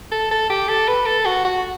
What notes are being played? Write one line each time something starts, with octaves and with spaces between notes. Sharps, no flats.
A4
A4
G4
A4
B4
A4
F#4
F#4